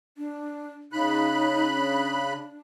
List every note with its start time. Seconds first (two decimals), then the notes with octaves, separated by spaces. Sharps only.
0.17 D4
0.93 C#3 D#4 B5 F#6
1.76 D4